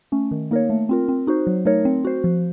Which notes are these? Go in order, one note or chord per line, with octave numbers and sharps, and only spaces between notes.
A3 C#4
D#3
A#3 D#4 A#4 C#5
A3
C4 F4 A#4
C4
D#4 F#4 C5
F#3
A3 D#4 A#4 C#5
C4
F#4 C5
F3